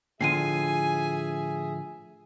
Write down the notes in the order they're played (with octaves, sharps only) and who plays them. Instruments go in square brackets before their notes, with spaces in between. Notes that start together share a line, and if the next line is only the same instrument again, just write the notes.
[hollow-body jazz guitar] A2 D3 F3 [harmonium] G#4 E5 [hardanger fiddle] G#5 [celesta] C7 D#7